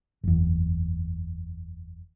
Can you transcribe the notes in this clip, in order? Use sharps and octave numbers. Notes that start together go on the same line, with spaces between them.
F#1 E2